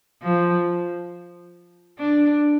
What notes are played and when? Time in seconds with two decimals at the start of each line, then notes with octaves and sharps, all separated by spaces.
0.22 F3
1.99 D4